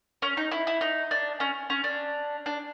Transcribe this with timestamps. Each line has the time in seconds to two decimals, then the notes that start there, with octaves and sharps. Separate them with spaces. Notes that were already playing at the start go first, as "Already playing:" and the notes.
0.22 C#4
0.37 D#4
0.51 E4
0.67 E4
0.81 D#4
1.11 D4
1.40 C#4
1.70 C#4
1.84 D4
2.46 D4